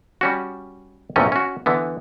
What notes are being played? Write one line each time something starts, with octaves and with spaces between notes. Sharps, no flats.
G3 C#4 F#4
A#1 E2 C3 A3 C#4 D#5
C#4 F#4
D3 E3 B3